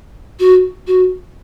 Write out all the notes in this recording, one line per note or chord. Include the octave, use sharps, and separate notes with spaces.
F#4
F#4